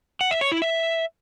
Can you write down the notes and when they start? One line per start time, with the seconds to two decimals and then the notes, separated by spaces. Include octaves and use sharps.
0.21 F#5
0.31 E5
0.41 C#5
0.52 E4
0.62 E5